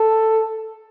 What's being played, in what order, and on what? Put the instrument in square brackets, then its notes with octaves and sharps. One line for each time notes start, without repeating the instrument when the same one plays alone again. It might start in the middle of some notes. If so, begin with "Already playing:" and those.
Already playing: [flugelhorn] A4